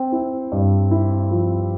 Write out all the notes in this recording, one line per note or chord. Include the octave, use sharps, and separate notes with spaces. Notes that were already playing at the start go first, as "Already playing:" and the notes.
Already playing: C4
E4
G2
E4
F3